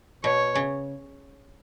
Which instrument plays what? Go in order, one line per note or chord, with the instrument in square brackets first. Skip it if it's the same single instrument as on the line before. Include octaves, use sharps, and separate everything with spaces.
[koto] B2 [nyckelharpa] C#5
[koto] C#3